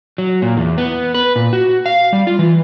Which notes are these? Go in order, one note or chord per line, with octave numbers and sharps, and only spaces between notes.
F#3
A#2
E2
B3
B4
A#2
F#4
F5
G3
F4
E3